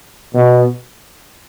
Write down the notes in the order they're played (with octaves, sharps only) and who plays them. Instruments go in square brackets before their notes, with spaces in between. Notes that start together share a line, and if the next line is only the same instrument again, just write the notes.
[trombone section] B2